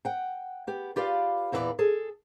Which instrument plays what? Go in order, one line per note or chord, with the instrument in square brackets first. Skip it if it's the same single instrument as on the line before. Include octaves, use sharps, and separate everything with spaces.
[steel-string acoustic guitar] F#5 G5
B3 G4
F4 G4 B4 D5 F5
E2 A#2 E3 D#4 B4 D5
G#4 A4